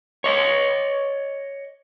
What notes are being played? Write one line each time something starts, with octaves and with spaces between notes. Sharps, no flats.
C#5 D#5